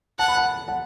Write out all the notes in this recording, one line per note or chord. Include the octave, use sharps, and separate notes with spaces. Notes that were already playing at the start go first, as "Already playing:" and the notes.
F#5 A5
B5
F#5 A5
F#5 A5